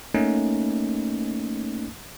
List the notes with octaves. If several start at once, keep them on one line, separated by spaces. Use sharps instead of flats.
A3 A#3 C#4 D#4